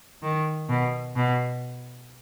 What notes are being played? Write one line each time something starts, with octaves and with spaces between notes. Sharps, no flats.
D#3
B2
B2